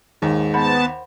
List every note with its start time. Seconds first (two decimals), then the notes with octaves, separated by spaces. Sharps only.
0.22 D#2 G#2
0.54 B3 C5 F#5 A5 B5